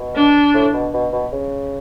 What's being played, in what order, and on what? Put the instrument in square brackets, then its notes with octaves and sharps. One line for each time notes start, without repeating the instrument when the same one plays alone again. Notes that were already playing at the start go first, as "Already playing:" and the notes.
Already playing: [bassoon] B2
[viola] D4
[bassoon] A2
B2
B2
B2
C#3